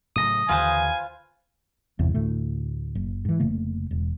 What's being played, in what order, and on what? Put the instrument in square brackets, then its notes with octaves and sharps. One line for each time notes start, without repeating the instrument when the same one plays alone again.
[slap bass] A2 C#3 F#3 [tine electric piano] D#6 A#6
[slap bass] D#2 D3 E3 [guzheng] F4 B4 C5 [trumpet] G#5
[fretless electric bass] G1 E2 G#2 C3
D2 A2 A3
F#1
G#2 E3
F1 C#3 A3 A#3
E1